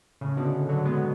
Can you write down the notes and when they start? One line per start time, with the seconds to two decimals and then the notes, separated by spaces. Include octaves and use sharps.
0.21 A2 C#3
0.37 B2 D3
0.69 D3 F#3
0.85 G#3 B3